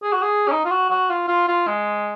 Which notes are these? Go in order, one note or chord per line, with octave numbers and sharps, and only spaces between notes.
G#4
F#4
G#4
C#4
D#4
F4
F#4
F#4
F4
F4
F4
G#3